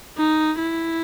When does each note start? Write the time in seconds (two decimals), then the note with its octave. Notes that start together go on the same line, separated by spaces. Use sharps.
0.17 D#4
0.59 E4